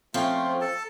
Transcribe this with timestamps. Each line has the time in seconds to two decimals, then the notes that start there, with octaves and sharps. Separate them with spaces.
0.14 F3 A3 C4 C#4 F4
0.61 A4 A5